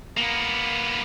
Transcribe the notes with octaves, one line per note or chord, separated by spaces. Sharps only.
A#3 B3